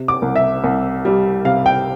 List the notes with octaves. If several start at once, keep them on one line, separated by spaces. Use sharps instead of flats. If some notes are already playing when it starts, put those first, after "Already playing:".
Already playing: C3
D6
C2
E5
C2
G3
C3 F5
G5